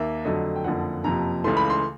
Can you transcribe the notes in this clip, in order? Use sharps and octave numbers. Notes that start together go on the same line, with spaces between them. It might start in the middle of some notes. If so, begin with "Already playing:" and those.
Already playing: D#2 A#3 E5
F2 D3 F#3 A3 D#5
G5
F#1 F2 D3 F3 F#5
F#1 F2 C3 F3 A#5
C#2 C#3 E3 A3 C6
B5
C6